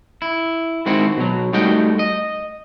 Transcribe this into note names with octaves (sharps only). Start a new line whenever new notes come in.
E4
G#2 D#3 C4 E4 F#4
B2 F#3
G3 A3 D#4 F#4 G5
D#5